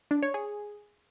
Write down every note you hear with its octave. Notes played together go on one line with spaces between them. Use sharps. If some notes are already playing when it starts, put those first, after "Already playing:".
D4
C#5
G#4